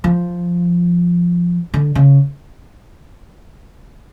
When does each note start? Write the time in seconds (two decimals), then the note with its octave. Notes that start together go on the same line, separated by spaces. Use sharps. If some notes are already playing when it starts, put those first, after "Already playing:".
0.04 F3
1.74 D3
1.95 C#3